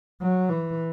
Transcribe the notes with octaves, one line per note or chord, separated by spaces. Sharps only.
F#3
E3